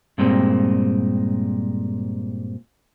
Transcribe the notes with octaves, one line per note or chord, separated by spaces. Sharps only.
G2 A#2 G#3 C4